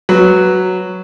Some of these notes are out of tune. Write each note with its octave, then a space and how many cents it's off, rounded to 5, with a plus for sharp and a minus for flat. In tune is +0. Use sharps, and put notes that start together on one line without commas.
F#3 +0 B4 +0